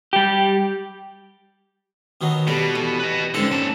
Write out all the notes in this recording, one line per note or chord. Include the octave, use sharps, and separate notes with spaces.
G3 G4
B2 D#3 F#3
B2 G3 A4
E2
B4 D#5
F2 G#2 D3 C#4 A4
A#3 A5